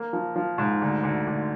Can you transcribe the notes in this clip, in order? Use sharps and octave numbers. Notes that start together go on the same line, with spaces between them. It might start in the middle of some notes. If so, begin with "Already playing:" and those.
Already playing: A#3
F3
F3
G#2
D2
D2
D2